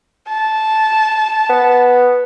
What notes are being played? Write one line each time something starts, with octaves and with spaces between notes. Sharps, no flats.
A5
B3